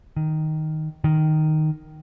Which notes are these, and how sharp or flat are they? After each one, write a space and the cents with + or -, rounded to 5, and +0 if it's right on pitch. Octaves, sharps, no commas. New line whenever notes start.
D#3 +0
D#3 -5